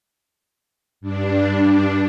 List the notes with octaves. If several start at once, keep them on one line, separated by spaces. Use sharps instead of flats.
G2 D4